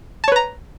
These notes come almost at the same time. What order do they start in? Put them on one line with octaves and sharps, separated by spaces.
A5 C#5 B4 A#5